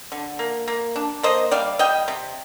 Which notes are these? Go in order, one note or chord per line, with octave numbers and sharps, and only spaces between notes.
D3
A#3
A#3
D4
A#3 C5 D#5
G3 D5 F5
G3 D#5 G5
C3